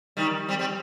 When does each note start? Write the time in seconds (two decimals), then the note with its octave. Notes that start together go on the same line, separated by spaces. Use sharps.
0.17 D#3 G3
0.49 G3 C4
0.59 G3 C4